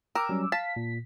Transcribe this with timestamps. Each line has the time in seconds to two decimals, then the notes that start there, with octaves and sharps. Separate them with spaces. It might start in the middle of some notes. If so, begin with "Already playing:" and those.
0.15 A#4 G5 D6 E6
0.29 F#3 G3 C#4
0.52 F5 A5 B6
0.76 A#2